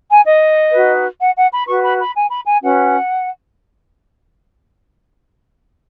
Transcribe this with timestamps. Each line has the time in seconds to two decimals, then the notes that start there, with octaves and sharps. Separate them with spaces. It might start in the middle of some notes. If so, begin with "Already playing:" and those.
0.09 G#5
0.24 D#5
0.72 D#4 F#4 B4
1.19 F#5
1.35 F#5
1.51 B5
1.66 F#4 B4 C#6
1.82 B5
1.99 B5
2.14 G#5
2.29 B5
2.46 G#5
2.61 C#4 F#4 B4 F#5